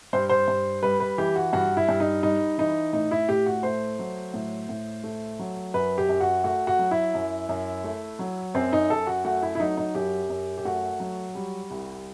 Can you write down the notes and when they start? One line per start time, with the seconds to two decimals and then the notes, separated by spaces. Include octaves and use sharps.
0.13 G2 C5
0.29 C5
0.48 G2
0.83 G3 B4
1.00 B4
1.18 E3 G4
1.36 F#4
1.53 G2 F#4
1.77 E4
1.89 G2
2.00 D#4
2.23 G3 D#4
2.58 E3 D#4
2.93 A2 D#4
3.11 E4
3.28 A2 G4
3.46 F#4
3.63 A3 C5
3.99 F#3
4.34 A2
4.69 A2
5.04 A3
5.39 F#3
5.74 F#2 B4
5.98 G4
6.09 F#2
6.21 F#4
6.44 A3 F#4
6.67 F#4
6.79 F#3
6.91 E4
7.14 F#2
7.49 F#2
7.84 A3
8.19 F#3
8.54 F#2 C4
8.73 D#4
8.90 F#2 A4
9.07 F#4
9.25 A3 F#4
9.43 E4
9.55 E4
9.60 F#3 D#4
9.77 D#4
9.95 F#2 G4
10.30 F#2
10.58 G4
10.65 A3 F#4
11.00 F#3
11.35 G3
11.70 C2